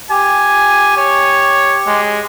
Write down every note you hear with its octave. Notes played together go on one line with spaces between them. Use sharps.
G4 G#5
C#5
G#3